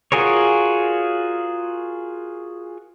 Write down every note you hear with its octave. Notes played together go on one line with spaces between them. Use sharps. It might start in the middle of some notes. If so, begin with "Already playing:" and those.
F4 F#4 G#4 A#4 C#5